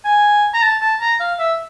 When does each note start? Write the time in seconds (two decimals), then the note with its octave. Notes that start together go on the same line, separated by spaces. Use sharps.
0.05 G#5
0.54 A#5
0.62 A5
0.81 A5
1.01 A#5
1.20 F5
1.39 E5